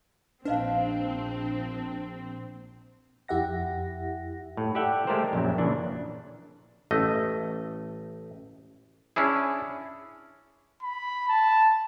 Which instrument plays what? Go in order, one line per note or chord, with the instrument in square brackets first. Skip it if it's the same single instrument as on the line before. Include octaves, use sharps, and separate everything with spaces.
[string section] A#1 C4 [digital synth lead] D4 [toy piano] B4 D#5 F5
[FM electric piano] F2 E4 G4 E5 F#5 A#6
[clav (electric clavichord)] A2
G4 A4 D5 E5 F#5 G5
G#3 A3 G4 A#4 C5
A#1 F#2 F#3 C4
A#2 C#3 E3 D4
A1 A3 D#5
C#4 D4 E4 G#4
[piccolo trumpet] B5
A5